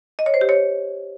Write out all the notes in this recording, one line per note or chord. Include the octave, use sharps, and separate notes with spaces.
D#5
C#5
C5
G4
C#5